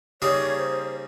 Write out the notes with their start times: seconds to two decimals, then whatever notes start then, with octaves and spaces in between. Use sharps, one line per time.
0.22 C#3 G3 A#3 D#4 G#4 C#5
0.57 C5